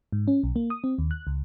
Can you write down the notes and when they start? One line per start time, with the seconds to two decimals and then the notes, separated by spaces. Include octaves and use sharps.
0.12 G#2
0.28 C#4
0.44 B1
0.56 A#3
0.70 D#6
0.84 C4
0.98 D#2
1.11 F#6
1.27 C#2